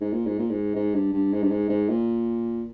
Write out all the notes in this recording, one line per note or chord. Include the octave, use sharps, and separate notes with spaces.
G#2
A#2
G#2
A#2
G#2
G#2
G2
G2
G#2
G2
G#2
G#2
A#2